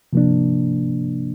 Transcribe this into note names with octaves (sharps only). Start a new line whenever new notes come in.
C3 F3 A#3 D4